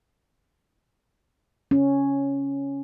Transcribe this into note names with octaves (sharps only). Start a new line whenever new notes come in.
C#4